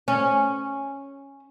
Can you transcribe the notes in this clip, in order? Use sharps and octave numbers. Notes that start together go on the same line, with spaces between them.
C#4